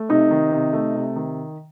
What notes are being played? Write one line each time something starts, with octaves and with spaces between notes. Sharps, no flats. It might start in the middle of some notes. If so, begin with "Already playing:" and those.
Already playing: A3
C3 D#4
D#3
C3
A3
C3
D#3